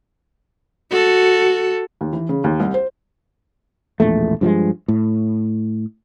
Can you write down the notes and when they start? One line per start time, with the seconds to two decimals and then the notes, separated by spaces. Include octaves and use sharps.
0.90 F#4 A4
2.01 D#2
2.13 E3
2.29 C#3
2.44 D#2
2.60 C2
2.74 C5
4.00 E1 A#1 E2 A3
4.41 G2 F3 F#3 G#3
4.88 A2